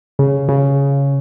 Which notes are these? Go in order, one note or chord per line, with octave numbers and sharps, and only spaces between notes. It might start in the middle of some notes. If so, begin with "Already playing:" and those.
C#3
C#3